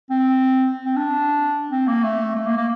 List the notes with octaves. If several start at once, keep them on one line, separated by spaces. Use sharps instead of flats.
C4
C4
D4
C4
A#3
A3
A3
A#3
A#3